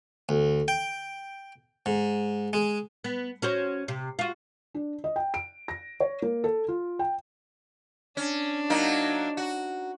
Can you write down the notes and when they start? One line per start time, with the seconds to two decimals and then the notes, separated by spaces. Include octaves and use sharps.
0.29 D2
0.68 G5
1.86 G#2
2.53 G#3
3.04 B3
3.42 C#4 F#4 C5
3.88 C3
4.19 F4 F#4
4.74 D4
5.04 D#5
5.16 G5
5.34 D7
5.68 A#6
6.00 C#5
6.22 A#3
6.44 A4
6.68 F4
6.99 G5
8.17 C#4 D4
8.70 F#3 A#3 D#4
9.37 F#4